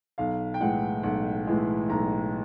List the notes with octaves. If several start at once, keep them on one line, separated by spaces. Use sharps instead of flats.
B1 F5
G5
A2 E3 G#3 F#5
B1 F#5
A2 E3 G#3
B1 A#5